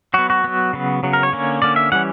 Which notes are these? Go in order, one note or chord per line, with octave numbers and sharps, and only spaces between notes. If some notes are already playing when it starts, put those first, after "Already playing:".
F#3 B3 F#4
F#4
F#3 B3
C#3 F#3 B3
C#3 F#3 B3
A#4
C#5
D3 A#3 C#4
D3 A#3 C#4 D5
E5
E3 G3 C#4 F#5